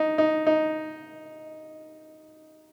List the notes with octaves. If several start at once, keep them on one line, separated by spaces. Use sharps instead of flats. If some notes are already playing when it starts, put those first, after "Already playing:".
Already playing: D#4
D#4
D#4